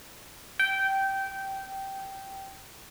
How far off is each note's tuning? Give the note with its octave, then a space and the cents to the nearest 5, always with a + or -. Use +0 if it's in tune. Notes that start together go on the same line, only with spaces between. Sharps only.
G5 -15